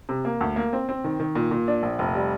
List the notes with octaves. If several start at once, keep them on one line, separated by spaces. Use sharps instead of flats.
C3
A#3
D2
A#3
C4
C4
D#3
D#3
A#2
A#2
D4
A#1
F1
G3